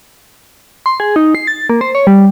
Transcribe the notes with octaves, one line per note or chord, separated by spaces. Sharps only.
C6
G#4
D#4
C7
A6
A#3
C5
C#5
G3